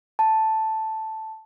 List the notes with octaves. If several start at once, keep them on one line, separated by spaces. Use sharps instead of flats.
A5